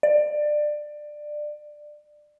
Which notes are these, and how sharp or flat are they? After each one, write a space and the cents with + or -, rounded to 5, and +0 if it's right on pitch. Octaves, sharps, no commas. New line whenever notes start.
D5 +20